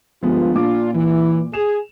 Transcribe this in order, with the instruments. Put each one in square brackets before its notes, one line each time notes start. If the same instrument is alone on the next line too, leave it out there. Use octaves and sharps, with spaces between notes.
[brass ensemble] G1 F4 [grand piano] F3 G#3 B3
[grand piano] A#2 D6 [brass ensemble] D4 F4
[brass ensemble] E3
[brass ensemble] G#4 [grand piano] E7 F7